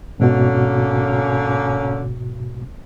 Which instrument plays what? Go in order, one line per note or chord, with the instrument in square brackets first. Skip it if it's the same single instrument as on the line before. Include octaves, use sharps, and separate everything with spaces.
[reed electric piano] G#2 B2 F#4 [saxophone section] D3 A#3 C#4